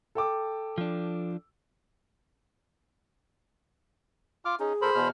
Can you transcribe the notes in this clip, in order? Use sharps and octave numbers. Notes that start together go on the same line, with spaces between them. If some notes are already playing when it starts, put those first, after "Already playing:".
A4 G5 D6
F3 D4
F4 D6 F6
C#4 D#4 G#4
A#2 A4 A#4 C5 B5
E2 B2 F6